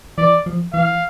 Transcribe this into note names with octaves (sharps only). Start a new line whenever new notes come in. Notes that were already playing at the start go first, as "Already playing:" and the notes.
E3 D5
F3
E3 F5